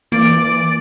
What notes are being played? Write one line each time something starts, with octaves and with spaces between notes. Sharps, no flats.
E3 A#3 D5 D7